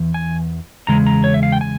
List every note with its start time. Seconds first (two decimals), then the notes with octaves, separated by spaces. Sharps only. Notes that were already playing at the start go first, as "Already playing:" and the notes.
Already playing: E2 E3
0.14 G#5
0.87 E2 C#3 G#3 A#5
1.07 A#5
1.24 C#5
1.34 E5
1.43 F5
1.52 G5
1.61 G#5